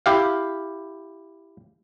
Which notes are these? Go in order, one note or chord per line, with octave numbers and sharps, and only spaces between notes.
E4 G4 F5